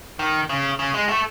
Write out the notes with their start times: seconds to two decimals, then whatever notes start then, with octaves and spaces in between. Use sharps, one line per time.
0.19 D#3
0.49 C#3
0.79 C#3
0.94 G#3
1.09 A3